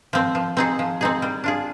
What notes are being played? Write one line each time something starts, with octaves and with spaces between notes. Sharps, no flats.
F3 C4
F3
C4 D#4 G#4
F3
C4 D#4 G#4
G3
D4 F4 G#4